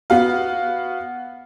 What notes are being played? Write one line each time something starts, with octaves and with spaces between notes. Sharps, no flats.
B3 F#4 F5